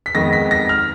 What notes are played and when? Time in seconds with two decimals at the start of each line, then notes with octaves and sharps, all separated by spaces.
0.06 B6
0.15 F2 D#3 G#3 B3 A#6
0.33 B6
0.51 A#6
0.69 F6